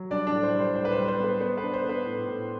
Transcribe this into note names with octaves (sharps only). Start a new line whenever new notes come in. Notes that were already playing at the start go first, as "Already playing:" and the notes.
Already playing: F#3
G3 D4 D5
D4 D5
A2
C5
G3
C5
A2 C5
B4
C5
G3
C5
B3
B4
B3 C5
D4 B4
C5
B3
B4
A2
A2